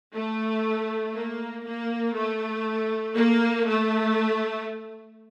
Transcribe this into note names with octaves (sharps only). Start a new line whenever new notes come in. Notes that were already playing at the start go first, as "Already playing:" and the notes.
A3
A#3
A#3
A3
A#3
A3